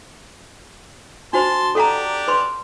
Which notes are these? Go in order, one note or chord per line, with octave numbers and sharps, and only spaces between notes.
D4 F#4 C5 A5 C6
D4 G4 A4 F#5 A#5
B4 C6